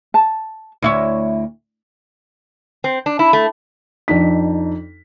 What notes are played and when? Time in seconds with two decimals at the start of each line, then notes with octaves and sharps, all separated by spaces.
0.14 A5
0.82 D2 E4 C#5
2.84 C4
3.06 D4
3.19 E4
3.33 A3
4.08 F2 D4 D#4 B6